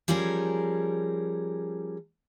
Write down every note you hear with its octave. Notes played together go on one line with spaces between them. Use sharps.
F3 G3 C#4 G#4 A#4